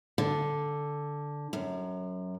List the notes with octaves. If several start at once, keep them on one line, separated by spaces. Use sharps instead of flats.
D3
F#2